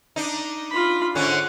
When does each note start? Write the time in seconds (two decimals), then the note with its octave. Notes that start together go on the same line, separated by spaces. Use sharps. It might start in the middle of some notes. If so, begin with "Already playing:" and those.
0.16 D4 D#4
0.72 F4 B5
1.15 G#2 D3 C#4 F#5